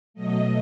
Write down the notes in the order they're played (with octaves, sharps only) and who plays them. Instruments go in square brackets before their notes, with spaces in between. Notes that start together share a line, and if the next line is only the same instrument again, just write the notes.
[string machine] B2 F#3 A3 D#5